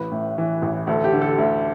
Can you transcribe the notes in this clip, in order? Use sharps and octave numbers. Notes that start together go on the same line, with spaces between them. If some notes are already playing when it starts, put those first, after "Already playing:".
Already playing: A1 B4
A2
E3
A1
D2 A4
G4
D3
A4
D2